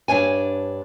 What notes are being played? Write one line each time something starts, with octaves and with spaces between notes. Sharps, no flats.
G2 D4 C#5 G#5